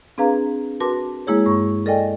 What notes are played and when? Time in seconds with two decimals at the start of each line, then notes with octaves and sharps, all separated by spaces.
0.18 C4 D4 G#4 B4 F5 A#5
0.80 F#4 A#4 B4 A5 C6 D6
1.27 G#3 A#3 E4 G#4 C#5
1.46 G2 C#6
1.86 A4 A#4 D5 D#5 G5 G#5